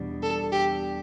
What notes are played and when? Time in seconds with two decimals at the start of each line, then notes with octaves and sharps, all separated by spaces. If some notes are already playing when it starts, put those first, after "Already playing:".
Already playing: E2 B2 G3 D4
0.23 A4
0.52 G4